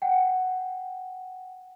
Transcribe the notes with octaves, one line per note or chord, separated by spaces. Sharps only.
F#5 G5